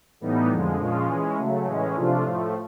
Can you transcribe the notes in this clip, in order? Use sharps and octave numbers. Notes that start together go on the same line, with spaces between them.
A2 E3 G3 B3 D#4
F2 D3 F3 G#3
A#2 F3 G#3 C#4 F4
E3 G#3 C#4
C#3 F#3 A3
A2 E3 G#3 C#4
C3 F3 A3 D4 F4
A2 F3 A3